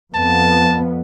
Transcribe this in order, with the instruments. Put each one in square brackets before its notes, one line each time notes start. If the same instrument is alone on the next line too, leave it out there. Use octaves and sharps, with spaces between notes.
[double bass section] F2 B3 [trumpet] A5